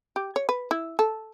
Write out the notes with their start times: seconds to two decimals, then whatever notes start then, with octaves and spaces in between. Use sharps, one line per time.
0.16 G4
0.36 C#5
0.49 B4
0.71 E4
0.99 A4